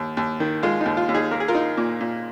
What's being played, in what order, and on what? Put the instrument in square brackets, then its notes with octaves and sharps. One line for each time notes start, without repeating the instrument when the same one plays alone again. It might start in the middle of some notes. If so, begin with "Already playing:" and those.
Already playing: [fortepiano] D#2
D#2
D#3
G#3 F4
D#4
D#2
F4
D#2
D#4 G#4
A#3 A#4
G#4
F4 A#4
D#4
A#2
A#2